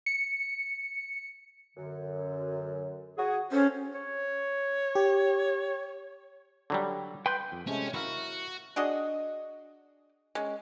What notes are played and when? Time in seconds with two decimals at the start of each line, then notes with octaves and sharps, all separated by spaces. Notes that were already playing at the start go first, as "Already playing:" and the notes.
0.06 C#7
1.77 F#2 D3
3.18 F#4 G#4
3.52 C4 C#4 A4 C5
3.94 C#5
4.95 G4
6.70 D3 F#3 G3
7.26 B4 G5 C6 G6
7.52 F2
7.67 C3 G#3 A3 C#4
7.94 E4 F#4 A#4 F5
8.76 D4 F#4 G#4 D#5
10.35 G#3 C#4